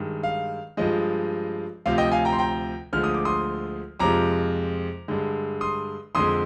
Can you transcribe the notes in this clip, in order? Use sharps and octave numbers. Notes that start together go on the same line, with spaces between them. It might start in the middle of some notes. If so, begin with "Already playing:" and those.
Already playing: G2 D#3 G#3
F5
G2 F3 G#3 D#5
D2 C3 F3 F5
D#5 G5
F5 G#5
G5 A#5
C6
G5 A#5
D2 D3 F3 G#3 F6
D#6
D6
C6 D#6
F2 C3 F3 G#3 A#5 D6
G2 D3 G#3
C6 D#6
F2 D3 G#3 C6 D#6